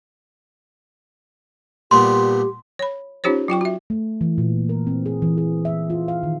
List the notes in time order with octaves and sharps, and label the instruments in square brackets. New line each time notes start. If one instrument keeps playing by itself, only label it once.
[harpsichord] A#2 G3 B3 [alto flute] G4 [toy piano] C6
[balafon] C#5 B5
C#4 D#4 F4 G4 C5 C#5
F#3 F4 G5 C#6
F#4 E5
[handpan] A3
E3
A#2
A#4
C4
G#4
E3
G#4
E5
F4
F5
D#3